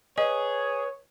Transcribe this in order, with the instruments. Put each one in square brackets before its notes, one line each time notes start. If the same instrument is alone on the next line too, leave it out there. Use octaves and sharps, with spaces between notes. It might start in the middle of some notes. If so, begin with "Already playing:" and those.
[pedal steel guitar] G#4 [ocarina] B4 [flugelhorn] C#5 [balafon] D#5